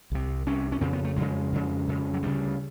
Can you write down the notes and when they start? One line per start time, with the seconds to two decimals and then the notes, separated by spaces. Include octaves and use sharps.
0.12 C2 C3
0.46 C2 C3 C#4
0.72 C#4
0.81 F2 C#3 C4
0.93 B3
1.04 A3
1.16 F2 C#3 G#3
1.52 F2 C#3
1.88 F2 C#3
2.14 F#3
2.23 D2 C#3 G3